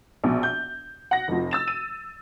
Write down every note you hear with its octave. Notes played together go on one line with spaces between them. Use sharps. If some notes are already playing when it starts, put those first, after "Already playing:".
A#1 B2
G6
F#5 A#6
F1 F3
E6 A6 E7
D#7